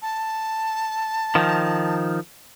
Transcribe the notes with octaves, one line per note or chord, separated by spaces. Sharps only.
A5
D#3 F3